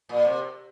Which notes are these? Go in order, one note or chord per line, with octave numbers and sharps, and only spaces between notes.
A#2
C3